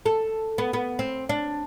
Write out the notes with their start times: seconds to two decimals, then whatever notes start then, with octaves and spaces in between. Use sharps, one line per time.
0.06 A4
0.58 B3
0.73 B3
0.99 C4
1.29 D4